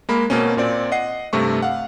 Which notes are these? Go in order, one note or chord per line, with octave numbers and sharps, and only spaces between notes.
G#3 A#3 B5
B2 A#3 C4 C#4
A#2 C4 D5
D#5 F#5 C7
G2 C3 A3 C#6
F5 F#5